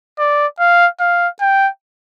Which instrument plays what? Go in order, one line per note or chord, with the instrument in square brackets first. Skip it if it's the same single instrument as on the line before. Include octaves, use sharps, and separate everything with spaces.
[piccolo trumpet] D5
F5
F5
G5